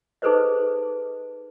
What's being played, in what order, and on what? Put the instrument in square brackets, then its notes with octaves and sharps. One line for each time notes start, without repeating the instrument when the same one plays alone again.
[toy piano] D#4 G#4 A4 B4 C5 D#5